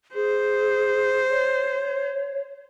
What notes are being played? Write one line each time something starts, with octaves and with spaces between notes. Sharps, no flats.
G#4 C5
C#5